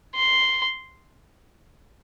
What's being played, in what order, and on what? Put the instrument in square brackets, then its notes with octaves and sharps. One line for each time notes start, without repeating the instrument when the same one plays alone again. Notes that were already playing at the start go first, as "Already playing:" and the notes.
[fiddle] C6